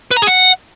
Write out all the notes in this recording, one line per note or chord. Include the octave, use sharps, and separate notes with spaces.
B4
A#5
G#4
F#5